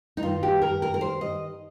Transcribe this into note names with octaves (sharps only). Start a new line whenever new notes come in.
D#4
G2 D#3 F4
G4
A#4
A#4
A#4
C5
D#5